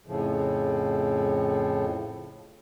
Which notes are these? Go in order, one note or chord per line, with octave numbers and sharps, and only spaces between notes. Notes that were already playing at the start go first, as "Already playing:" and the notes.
F2 A2 C#3 F3